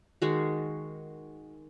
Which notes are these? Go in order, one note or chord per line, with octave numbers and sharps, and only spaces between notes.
D#3 G#3 F#4